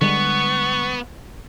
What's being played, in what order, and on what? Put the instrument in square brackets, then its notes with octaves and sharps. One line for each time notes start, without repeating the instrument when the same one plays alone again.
[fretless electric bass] D3 G3 G#3 [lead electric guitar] B3 [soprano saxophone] C#6